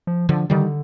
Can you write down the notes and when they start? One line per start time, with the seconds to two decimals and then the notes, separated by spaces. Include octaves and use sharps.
0.07 F3
0.29 D3 F3
0.50 D3 D#3 G3